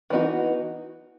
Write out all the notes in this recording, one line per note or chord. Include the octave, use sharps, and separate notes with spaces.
E3 B3 D#4 F#4